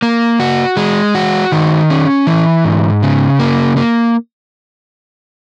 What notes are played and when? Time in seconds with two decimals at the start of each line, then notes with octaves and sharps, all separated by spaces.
0.02 A#3
0.40 F#4
0.77 G#3
1.15 F#4
1.52 D#3
1.90 C#4
2.27 E3
2.65 G#2
3.02 C#3
3.39 A#3
3.77 A#3